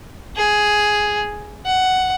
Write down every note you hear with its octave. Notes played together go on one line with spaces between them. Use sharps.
G#4
F#5